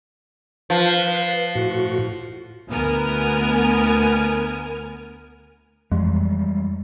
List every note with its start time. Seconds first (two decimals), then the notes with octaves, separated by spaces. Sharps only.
0.70 F3 B4
1.55 A2 F#4
2.69 D2 B3 A#4 G#5 F6
5.92 F2 E3 G3 G#3